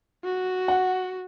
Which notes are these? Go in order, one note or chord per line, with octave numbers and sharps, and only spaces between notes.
F#4
F#5